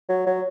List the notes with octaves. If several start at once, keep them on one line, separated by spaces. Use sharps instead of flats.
F#3
F#3